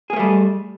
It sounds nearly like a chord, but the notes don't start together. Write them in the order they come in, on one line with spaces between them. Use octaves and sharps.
G#4 A#3 A3 G3